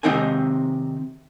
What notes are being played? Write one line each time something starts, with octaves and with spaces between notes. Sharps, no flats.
C3 D#3 C4 D#4 G#5